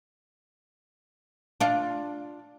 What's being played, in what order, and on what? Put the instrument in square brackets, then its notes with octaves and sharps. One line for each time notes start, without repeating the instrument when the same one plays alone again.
[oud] D4 F4